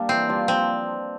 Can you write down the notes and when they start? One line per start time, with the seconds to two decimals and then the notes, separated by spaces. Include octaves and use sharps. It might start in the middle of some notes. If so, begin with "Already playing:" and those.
Already playing: G3 A#3 D4
0.09 E3 C4
0.29 G3 D4 F4
0.48 F3 C4